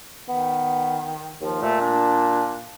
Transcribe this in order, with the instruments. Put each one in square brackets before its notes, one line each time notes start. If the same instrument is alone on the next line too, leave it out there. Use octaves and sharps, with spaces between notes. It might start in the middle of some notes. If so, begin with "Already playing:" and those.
[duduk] D#3 [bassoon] B3
[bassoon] D#2 [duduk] F3
[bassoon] A#2 [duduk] A3
[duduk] D4